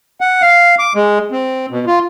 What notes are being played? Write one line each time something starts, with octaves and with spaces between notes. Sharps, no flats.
F#5
F5
D6
G#3
C4
B2
F4